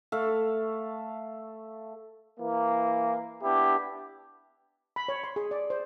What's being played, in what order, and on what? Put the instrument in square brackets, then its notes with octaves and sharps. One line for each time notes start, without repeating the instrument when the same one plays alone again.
[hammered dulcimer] A3 A4 E5 F5
[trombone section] E3 A#3
B3 D4 E4 G4
[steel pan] B5
C#5
C6
G#4
D5
C5